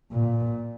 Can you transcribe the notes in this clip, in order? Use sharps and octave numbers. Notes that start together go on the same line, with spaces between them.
A#2